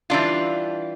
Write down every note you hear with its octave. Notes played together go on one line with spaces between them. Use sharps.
E3 G3 D4 F4